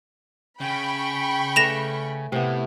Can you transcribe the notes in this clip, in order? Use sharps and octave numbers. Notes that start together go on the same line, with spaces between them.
C#3 G5 B5 C#6
A3 B4 D5 A#6 E7 F7
A2 C3 B3